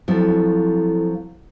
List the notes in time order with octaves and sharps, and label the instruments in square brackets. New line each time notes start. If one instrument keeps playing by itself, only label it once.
[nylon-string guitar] F3 F#3 C4 [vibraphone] E4 A4